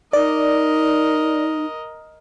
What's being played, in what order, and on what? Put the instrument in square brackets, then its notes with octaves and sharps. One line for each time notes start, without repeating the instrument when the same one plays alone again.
[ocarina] D#4 [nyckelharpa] A#4 D#5 [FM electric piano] D5